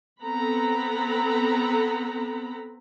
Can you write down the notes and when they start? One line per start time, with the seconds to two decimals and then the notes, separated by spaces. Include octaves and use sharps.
0.21 B3 C4 A4 A#5 B5